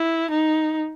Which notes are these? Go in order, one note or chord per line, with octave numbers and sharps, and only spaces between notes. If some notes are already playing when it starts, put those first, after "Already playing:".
Already playing: E4
D#4